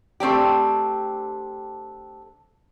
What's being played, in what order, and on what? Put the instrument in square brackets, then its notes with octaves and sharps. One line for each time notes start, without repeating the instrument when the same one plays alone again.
[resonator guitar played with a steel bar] A3 C4 D4 G4